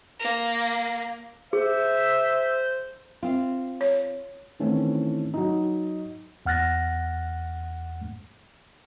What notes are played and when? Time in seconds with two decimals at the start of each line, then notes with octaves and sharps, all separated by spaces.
0.20 A#3
1.53 G#4 C5 E5
3.23 C4 F4
3.81 C#5
4.59 D#3 E3 A3 C4 C#4 E4
5.34 F#3 D#4
6.46 E2 F#5 F6 F#6 A6 A#6